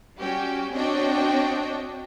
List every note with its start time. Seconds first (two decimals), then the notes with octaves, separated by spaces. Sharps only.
0.18 G3 C#4 F#4 G4 G5
0.73 C4 D4 F#4 C#5 D#5 G5